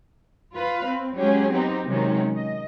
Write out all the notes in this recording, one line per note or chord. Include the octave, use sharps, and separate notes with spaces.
F4 B4 F5
C4
F#3 G#3 C#4 G4 G#4
B3 C4 D#4 G4
C3 D#3 F#3 G#3 C#4
D#5